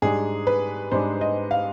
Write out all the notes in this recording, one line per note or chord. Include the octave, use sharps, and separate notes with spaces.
G#2 G3 D4 G#4
B4
G#2 G3 D4 C5
D#5
F5